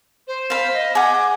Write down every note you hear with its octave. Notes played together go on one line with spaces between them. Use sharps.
C5
F5 B5
D#5
G#4 F#5 D6